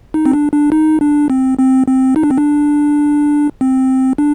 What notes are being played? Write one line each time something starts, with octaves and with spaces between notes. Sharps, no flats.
D#4
C4
D4
D4
D#4
D4
C4
C4
C4
D#4
D4
C4
D4
C4
D4